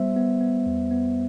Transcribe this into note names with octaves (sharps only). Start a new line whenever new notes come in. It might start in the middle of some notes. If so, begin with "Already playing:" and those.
Already playing: G3 B3 C5 E5
B3
B3
E2
B3